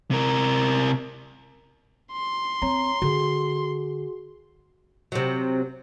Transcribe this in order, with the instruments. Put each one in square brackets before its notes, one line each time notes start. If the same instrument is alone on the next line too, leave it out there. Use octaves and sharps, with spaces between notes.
[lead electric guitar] C3 A#4
[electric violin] C6
[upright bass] C4 [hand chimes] C#5 A#5
[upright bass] D3 [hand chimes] F#4 G#4
[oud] C3 F#3